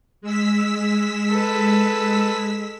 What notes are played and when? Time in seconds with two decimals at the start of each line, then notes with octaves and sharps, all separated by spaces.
0.21 G#3 E6 B6
1.30 A4 B4